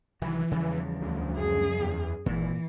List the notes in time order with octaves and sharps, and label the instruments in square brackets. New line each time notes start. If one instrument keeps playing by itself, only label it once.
[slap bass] C2 D#3 F#3 [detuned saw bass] E3
[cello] E2 [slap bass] C#3 F3 G3
[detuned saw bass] D2
[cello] F#2 G#4
[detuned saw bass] E2
[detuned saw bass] G#1 [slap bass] A#2 [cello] E3